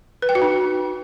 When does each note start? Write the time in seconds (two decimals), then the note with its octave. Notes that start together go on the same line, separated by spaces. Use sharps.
0.22 B4
0.29 G5
0.35 F#4
0.42 D#4